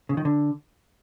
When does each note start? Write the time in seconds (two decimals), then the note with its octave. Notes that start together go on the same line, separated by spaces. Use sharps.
0.09 C#3
0.17 D#3
0.25 D3